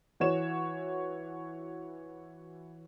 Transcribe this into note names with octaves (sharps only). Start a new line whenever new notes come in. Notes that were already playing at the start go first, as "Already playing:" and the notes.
E3 F#4 C#5 E7